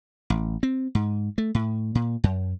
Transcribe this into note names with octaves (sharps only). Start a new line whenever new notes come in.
A1
C4
G#2
A3
A2
A#2
F#2